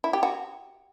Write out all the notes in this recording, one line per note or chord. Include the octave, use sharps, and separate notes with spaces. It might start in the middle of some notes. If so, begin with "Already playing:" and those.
E4
G4
F#4